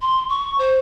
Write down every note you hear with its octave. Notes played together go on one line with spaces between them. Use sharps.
C6
C#6
C5